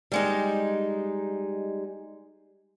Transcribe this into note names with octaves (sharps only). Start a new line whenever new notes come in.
G3 G#3 D#4